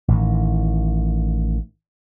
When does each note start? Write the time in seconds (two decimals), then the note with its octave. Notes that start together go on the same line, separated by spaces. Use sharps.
0.08 A1 A2 D#3